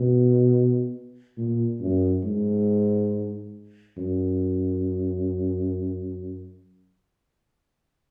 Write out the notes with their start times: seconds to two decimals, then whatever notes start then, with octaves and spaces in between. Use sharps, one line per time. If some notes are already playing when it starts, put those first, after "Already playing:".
Already playing: B2
1.37 A#2
1.81 F#2
2.24 G#2
3.98 F#2